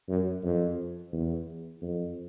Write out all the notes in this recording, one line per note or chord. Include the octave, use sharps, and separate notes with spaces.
F#2
F2
E2
F2